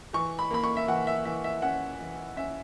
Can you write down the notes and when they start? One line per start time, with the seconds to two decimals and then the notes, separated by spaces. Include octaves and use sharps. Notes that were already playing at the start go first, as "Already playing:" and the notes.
0.13 E3 C#6
0.39 B5
0.51 A#3 B5
0.64 C#6
0.77 E5
0.88 E3 F#5
1.07 E5
1.25 E3 E5
1.44 E5
1.62 C#4 F#5
1.99 E3
2.37 C#4 E5